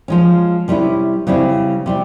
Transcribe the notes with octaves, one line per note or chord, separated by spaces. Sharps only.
F3 G#3 C#4
C3 G3 C#4 E4
C#3 G3 C4 E4
C3 G3 C4